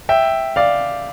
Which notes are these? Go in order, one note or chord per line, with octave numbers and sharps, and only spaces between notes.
E5 G5
D5 F5